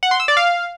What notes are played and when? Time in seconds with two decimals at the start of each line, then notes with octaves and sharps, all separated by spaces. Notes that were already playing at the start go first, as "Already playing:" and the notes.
0.03 F#5
0.11 C6
0.20 E6
0.28 D5
0.37 F5